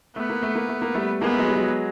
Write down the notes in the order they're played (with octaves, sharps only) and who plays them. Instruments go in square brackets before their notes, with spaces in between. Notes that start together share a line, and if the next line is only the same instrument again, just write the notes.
[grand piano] A3 [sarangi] B3
[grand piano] A#3
A3
A#3
A3
A#3
G3 A3
[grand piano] G#3 A#3 [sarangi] B3
[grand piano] A3
F#3 G#3
G3
F#3 G#3